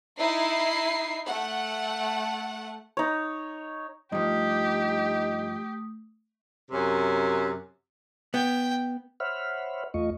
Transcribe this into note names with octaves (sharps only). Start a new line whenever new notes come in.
D#4 E4 C7
A3 F#5
D#4 C#5
G2 F3 A3 D#4 G4 D#6
F#2 C3 C#4
B3 G5
C5 C#5 E5 F#5 B5 F6
E2 A3 F4 D#5 C#6